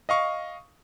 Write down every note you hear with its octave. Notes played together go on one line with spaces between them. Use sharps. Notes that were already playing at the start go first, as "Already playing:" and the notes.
D#5 F5 C#6